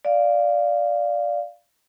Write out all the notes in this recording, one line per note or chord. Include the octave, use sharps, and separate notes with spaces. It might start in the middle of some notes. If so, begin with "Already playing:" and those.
D5 F5